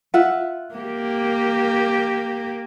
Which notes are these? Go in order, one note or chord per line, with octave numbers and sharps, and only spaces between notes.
F4 E5 F#5
A#3 G4